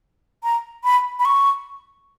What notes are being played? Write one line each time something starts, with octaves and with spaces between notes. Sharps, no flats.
A#5
B5
B5
C#6